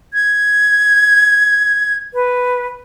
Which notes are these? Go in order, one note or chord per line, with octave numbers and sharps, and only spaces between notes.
G#6
B4